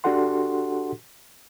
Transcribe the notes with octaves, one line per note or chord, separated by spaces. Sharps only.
D4 F#4 G4 A4 F#5 C6